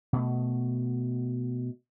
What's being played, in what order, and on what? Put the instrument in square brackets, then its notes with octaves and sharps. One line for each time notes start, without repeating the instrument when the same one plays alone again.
[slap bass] B2 A3